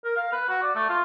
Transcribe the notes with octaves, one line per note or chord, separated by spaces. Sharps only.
A#4
F5
B4
F#4
D5
A3
F4